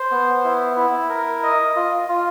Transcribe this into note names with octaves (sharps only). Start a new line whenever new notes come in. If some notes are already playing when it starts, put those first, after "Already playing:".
Already playing: C5
B3
E4
E4
A#4
D#5
F4
F4